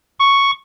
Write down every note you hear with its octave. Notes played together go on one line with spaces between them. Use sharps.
C#6